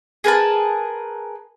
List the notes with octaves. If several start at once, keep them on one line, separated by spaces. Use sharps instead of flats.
G#4 A#4 B4 A5